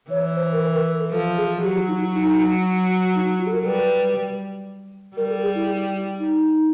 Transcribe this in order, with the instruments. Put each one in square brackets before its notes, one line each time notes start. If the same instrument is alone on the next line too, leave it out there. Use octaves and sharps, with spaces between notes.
[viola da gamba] E3 [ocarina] C#5
[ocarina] C5
A#4
B4
A#4
B4
A4
[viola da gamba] F3 [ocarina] A4
[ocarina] G#4
[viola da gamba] F#3 [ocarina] G4
[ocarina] F4
D#4
E4
D#4
D#4
F4
A4
A#4
[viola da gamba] G3 [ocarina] B4
[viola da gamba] G3 [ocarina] A#4
[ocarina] A4
G#4
E4
D#4